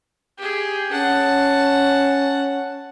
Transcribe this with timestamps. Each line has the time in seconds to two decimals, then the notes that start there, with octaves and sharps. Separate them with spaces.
0.38 G4 G#4
0.92 C#4 F#5 A5